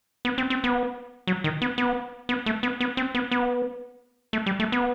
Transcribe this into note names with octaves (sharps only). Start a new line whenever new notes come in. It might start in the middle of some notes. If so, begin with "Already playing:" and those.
B3
C4
C4
B3
F#3
D#3
B3
B3
B3
A3
B3
B3
C4
B3
B3
A3
G3
A3
B3